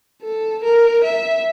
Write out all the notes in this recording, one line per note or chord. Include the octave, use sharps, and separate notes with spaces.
A4
A#4
E5